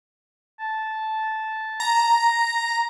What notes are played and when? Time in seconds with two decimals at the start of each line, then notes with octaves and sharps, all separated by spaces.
0.60 A5
1.80 A#5